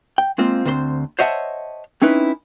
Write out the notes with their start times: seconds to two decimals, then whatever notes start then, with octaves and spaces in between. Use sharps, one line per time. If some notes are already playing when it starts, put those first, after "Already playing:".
0.18 G5
0.38 G#3 A#3 C4 F4
0.65 D2 C4 C5 B5 C6
1.19 C5 C#5 D#5 E5 F#5 A5
2.02 C4 C#4 D#4 E4 B4